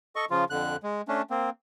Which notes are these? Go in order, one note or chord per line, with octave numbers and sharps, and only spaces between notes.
A4 D#5 C#6
C#3 F3 F4
F2 D3 F#6
G#3
A3 C#4 D4
A#3 C4